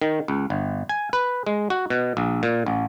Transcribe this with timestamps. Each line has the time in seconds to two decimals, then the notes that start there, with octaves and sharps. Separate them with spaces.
0.02 D#3
0.28 C#2
0.50 G1
0.89 G#5
1.13 B4
1.47 G#3
1.70 F#4
1.90 B2
2.17 A#1
2.43 A#2
2.66 A1